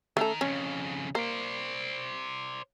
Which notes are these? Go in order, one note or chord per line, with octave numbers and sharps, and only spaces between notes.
D#3 A3 C#4 A4 A#5
F2 C#3 C#4
A#3 C5 D5